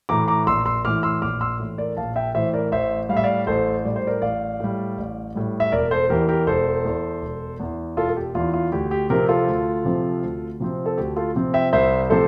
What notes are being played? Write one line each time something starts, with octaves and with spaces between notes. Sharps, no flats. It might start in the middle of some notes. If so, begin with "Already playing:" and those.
A2 E3 A#5 D6
A#5 D6
A#1 C6 E6
C6 E6
A2 E3 D6 F6
C6 E6
A#1 D6 F6
C6 E6
A2 E3
A#4 D5
A#1 F5 A5
E5 G5
A2 E3 C5 E5
A#4 D5
A1 C5 E5
A2 G3 E5 F5
D5 F5
A1 A4 C5
A2 G3 D5
C5
A#4 D5
A1 D5 F5
A2 G3
A1
A2 G3
E5
E1 A#4 D5
A4 C5
E2 E3 G4 A#4
G4 A#4
E1 A4 C5
E2 E3
E1
E2 E3
E1 F4 A4
A4
G4
E2 E3 F4
F4
D2 G4
G4
C3 F3 C4 G4 A#4
F4 A4
D2
C3 F3 C4
D2
C3 F3 C4
A4
D2 G4
F4 A4
C3 F3 C4
E5 G5
C2 C5 E5
C3 F3 A3 A4 C5